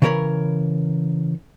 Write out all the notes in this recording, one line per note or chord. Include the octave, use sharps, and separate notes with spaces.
C#3 E3 G3 A#4 C#5 B5